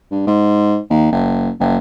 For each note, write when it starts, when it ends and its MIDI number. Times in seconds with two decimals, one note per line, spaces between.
0.11 0.25 43
0.27 0.78 44
0.90 1.09 39
1.12 1.50 30
1.60 1.77 30